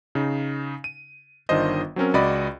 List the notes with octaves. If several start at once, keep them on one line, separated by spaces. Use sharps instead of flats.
C#3 D#4
D#7
G1 D#3 D4 F4 C5 D#5
F#3 C4 C#4 A#4
C#2 F#4 D5 D#5 B5